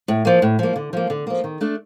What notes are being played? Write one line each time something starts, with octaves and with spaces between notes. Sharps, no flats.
A2
F3 A#3
A2
F3 A#3
D3
F3 A#3
D3
F3 A#3
D#3
A3 D4